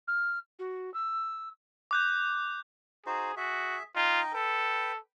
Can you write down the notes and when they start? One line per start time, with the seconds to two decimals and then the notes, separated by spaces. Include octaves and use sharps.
0.08 F6
0.59 F#4
0.94 E6
1.91 D6 F#6 G6
3.06 D#4 F#4 G#4 C5
3.37 F#4 G#4 E5
3.96 D#4 F4 D#5 G5
4.34 A4 B4 G5